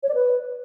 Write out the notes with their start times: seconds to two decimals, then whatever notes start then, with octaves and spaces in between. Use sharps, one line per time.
0.03 C#5
0.09 D5
0.14 B4